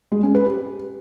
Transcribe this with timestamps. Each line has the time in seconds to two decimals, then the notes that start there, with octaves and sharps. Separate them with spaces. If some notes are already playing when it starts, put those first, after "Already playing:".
0.12 G#3
0.23 C#4
0.35 B4
0.46 G4